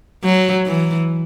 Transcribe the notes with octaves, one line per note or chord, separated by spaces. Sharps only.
F#3
E3